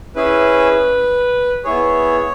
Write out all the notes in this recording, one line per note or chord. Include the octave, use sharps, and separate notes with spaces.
C#4 E4 G#4 B4
B3 E4 G#4 C#5